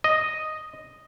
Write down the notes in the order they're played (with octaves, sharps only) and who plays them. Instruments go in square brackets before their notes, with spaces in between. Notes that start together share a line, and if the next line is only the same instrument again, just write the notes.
[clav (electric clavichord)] D#5